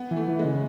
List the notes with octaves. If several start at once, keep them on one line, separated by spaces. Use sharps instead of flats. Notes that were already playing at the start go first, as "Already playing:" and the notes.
Already playing: B3
E3
A3
E3
G#3
C#3